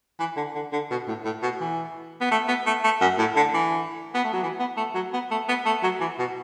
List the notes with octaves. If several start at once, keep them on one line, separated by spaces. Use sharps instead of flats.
E3
D3
D3
D3
B2
A2
A2
B2
E3
B3
A3
B3
A3
A3
F#2
A2
D3
E3
B3
A3
F#3
E3
B3
A3
F#3
B3
A3
B3
A3
F#3
E3
B2